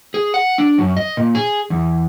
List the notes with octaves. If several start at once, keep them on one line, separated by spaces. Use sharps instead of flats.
G#4
F#5
D4
F#2
D#5
A#2
G#4
E2